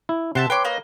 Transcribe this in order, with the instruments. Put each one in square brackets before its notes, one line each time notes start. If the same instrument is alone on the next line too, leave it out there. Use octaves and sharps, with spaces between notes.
[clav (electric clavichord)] E4
[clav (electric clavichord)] C3 F#5 [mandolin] E5 A5 C6
[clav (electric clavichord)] B4 C#5 [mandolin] G5 C6 D6
[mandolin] A#3 D#5